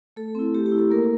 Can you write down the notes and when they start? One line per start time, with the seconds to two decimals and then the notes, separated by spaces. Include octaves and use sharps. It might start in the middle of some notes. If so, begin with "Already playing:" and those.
0.16 A3 A4
0.35 C4 E4
0.55 A3 G4
0.66 G4
0.72 E4
0.79 A4
0.90 A#3 A#4